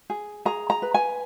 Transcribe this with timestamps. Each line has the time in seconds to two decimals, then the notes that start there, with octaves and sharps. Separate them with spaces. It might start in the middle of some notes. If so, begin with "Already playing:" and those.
0.10 G#4
0.45 G#4 A#5
0.70 A#5
0.82 B4
0.94 G#5